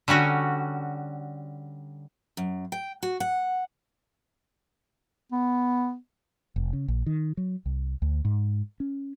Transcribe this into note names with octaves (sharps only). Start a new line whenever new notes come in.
D3 G3 C#4 F#4
F#2
G5
F#4
F#5
B3
F1
C#3
A#1
D#3
F#3
C2
D2
G#2
C#4